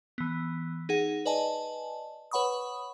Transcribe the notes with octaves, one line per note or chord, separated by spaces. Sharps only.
E3 B3
D#4 G#4 F#5
B4 D5 D#5 G#5 A5
B4 C#5 F#5 B5 C#6 D#6